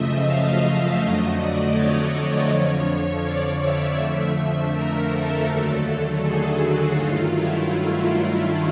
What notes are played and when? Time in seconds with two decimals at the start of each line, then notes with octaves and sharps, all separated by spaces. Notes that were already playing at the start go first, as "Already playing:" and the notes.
Already playing: F#2 C#3 F3 A3 D#5 E5
0.24 F5
0.61 E5
0.98 F2 D3 F#3 A3 D#5
1.36 D5
1.73 C#5
2.11 C#5
2.48 F2 D3 F3 C#5
3.22 D5
3.60 E5
3.97 F2 D3 F3 A3
4.72 A#4
5.09 A4
5.46 D#2 D3 F#3 A3
6.21 G#4
6.59 F#4
6.95 G2 D#3 F#3 A3 F4
7.32 E4
8.06 F4